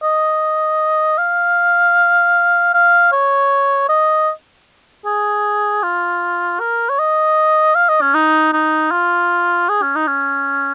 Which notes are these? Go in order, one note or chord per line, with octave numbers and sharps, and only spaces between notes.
D#5
F5
F5
C#5
D#5
G#4
F4
A#4
C#5
D#5
F5
D#5
C#4
D#4
D#4
F4
G#4
C#4
D#4
C#4